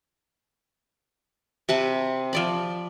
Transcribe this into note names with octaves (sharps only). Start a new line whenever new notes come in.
C3 B4 A5
F3 D5 B5